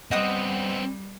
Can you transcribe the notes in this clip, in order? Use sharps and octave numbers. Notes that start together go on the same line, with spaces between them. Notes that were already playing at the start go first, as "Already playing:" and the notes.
G3 B3 C4 D#5 F#5 D#6